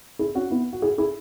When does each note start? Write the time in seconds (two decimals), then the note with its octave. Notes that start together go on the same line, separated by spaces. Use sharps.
0.19 E4 G#4
0.35 C#4 F#4
0.50 B3 E4
0.73 F#4
0.82 E4 G#4
0.98 E4 G#4